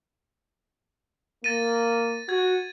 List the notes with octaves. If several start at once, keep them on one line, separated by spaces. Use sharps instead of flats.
A#3 A6 A#6 D#7
F#4 G#6